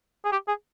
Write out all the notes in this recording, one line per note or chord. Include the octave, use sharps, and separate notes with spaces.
G#4
G4
G#4